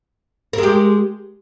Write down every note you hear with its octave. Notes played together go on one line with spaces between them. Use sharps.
G#3 G4 A#4